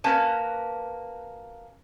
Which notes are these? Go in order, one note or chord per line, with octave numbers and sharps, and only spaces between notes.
A#3 C#4 F#4 B4 G#5 A5